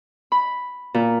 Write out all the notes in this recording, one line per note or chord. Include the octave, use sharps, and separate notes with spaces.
B5
A#2